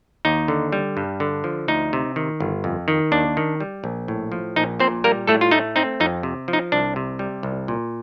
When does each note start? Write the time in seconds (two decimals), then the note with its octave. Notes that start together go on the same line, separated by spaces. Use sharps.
0.25 D#2 D#4
0.48 D3
0.72 G3
0.97 G2
1.20 D3
1.44 F3
1.68 D2 D#4
1.93 C3
2.16 D#3
2.40 G1
2.64 F2
2.88 D#3
3.12 D#2 D4
3.37 D#3
3.60 G3
3.84 A#1
4.08 A2
4.32 F3
4.56 A#1 D#4
4.80 A#2 C4 C5
5.04 G3 A#3 A#4
5.27 A2 A3 A4
5.41 F4
5.51 A3 D#4
5.76 C4 D#4
6.00 F2 D#4
6.23 C3
6.48 F3
6.53 D#4
6.72 C2 D4
6.96 C3
7.19 G3
7.43 C2
7.68 A#2